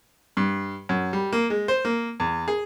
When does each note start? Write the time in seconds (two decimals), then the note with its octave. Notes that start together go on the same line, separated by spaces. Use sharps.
0.37 G2
0.89 F#2
1.13 G3
1.32 A#3
1.50 G#3
1.68 C5
1.85 A#3
2.20 E2
2.48 G#4